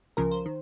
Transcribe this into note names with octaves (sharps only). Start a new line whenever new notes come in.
C#2 C#3 F3 A#4
C5
D#3